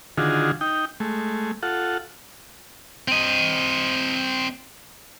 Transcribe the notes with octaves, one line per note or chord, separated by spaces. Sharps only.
D3 D#3 F4 F#4 G#4
D#4 G5
G#3 A3
F4 A4 F#5
C4 D#5